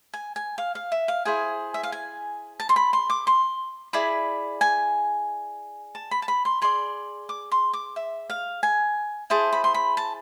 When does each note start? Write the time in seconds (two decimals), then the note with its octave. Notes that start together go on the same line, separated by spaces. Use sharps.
0.13 G#5
0.36 G#5
0.58 F5
0.75 F5
0.92 E5
1.08 F5
1.25 E4 G#4 C5 G#5
1.74 E5
1.83 F5
1.92 G#5
2.60 A5
2.69 C6
2.76 B5
2.93 C6
3.10 D6
3.27 C6
3.93 E4 G#4 D5 B5
4.61 G#5
5.95 A5
6.11 B5
6.22 A5
6.28 B5
6.45 C6
6.62 G#4 D5 C6
7.29 D6
7.51 C6
7.73 D6
7.96 E5
8.30 F5
8.63 G#5
9.30 E4 G#4 C5 A5
9.53 B5
9.64 C6
9.74 B5
9.97 A5